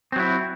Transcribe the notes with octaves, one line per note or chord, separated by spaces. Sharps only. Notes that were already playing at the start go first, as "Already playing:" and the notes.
F#3 C4 E4